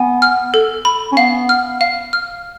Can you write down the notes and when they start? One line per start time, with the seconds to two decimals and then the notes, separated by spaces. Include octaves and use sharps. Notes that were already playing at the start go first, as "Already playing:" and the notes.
Already playing: B3 G#5
0.22 F6
0.54 A4
0.85 B5
1.12 C#4
1.17 B3 F5
1.49 F6
1.81 F5
2.13 F6